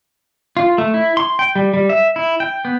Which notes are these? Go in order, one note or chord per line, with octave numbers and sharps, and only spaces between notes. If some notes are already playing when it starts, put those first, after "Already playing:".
F4
A3
E4
C6
G5
G3
G3
E5
E4
G5
B3